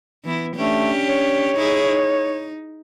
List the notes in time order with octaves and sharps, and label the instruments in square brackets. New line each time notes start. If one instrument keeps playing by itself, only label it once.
[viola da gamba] E3 B3 E4
[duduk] A3 [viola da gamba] C#4 D4 G4
[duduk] C#5
[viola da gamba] D#4 E4 G#4
D#4